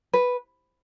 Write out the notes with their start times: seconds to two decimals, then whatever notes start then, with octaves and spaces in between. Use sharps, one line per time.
0.13 B4